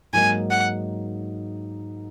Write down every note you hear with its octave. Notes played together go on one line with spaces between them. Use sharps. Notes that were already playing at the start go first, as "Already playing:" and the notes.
G#2 F#3 A#3 D#4 G#5
F#5